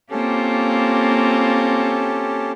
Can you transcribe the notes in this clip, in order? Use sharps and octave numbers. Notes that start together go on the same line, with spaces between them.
A#3 C4 C#4 F4 G4 A4